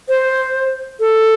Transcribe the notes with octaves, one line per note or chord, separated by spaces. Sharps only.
C5
A4